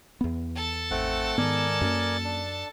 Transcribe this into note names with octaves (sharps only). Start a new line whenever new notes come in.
E2 B3
A4 A5
G#1 A3 C4 F#5
G#2 D#3 G#3 B3 A#4 D5 G#5
F#2 A#3 C#4
D4